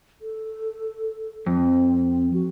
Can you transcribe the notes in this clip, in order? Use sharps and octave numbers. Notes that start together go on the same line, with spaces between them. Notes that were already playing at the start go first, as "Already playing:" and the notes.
A4
F2 C4
F#4